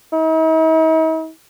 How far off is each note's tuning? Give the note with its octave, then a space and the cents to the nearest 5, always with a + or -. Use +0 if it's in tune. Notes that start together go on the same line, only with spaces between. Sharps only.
D#4 +45